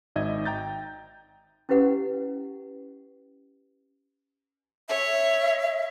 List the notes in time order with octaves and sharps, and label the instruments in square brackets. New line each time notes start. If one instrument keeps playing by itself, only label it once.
[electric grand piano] G#1 D#4 D#5 E5 G#6
G5 A#5 G6 A6
[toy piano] C#4 E4 G4 B4 F#5
[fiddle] C#5 [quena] E5